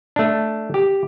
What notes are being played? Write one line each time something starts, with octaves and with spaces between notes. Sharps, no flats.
A3 D4
G4